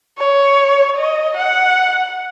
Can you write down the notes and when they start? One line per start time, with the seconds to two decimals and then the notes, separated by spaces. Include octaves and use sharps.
0.18 C#5
0.96 D#5
1.36 F#5